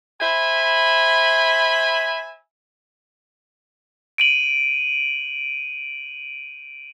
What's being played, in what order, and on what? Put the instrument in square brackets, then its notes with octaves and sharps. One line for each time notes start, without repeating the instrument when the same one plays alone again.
[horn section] C5 E5 G#5 B5
[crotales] D7 D#7 F#7